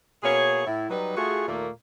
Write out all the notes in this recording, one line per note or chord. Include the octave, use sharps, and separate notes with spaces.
B2 A#3 G#4 C#5
A2 E4
F#3 G3 D#4 B4
A3 F4 F#4 G#4
D#2 A#2 A3 A#3